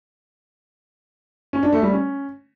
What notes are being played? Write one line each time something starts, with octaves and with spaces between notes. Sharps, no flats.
C#4
D4
A3
G3
C#4